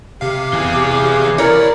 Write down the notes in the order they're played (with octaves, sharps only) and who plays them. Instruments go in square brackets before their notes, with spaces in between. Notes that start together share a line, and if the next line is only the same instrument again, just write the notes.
[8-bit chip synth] C3 F5 [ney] G4
[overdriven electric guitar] E3 G#4
[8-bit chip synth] E4 D5 [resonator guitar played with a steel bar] A#4 C#5